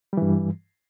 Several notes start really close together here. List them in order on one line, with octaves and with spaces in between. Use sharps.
G3 E3 G2